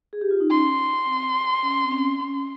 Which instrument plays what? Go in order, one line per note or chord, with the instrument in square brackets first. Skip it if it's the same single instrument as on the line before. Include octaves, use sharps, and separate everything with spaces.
[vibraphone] G#4
G4
F4
D#4
[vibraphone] C#4 [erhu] C6
[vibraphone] C4
C#4
C4
C#4
C#4